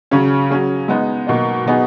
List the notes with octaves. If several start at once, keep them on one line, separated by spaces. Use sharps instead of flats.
C#3 F#3 C#4 G#4
F#3 C#4 G#4
G#3 B3 D#4
B2 F#3 A#3 D#4
B2 F#3 B3 D#4 G#4